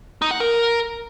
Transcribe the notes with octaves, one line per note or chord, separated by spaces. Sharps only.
D#4
F#5
A#4